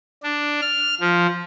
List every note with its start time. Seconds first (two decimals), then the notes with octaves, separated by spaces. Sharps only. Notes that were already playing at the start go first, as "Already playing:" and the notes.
0.23 D4
0.61 F6
1.01 F3